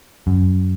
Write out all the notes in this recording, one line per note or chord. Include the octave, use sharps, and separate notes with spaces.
F#2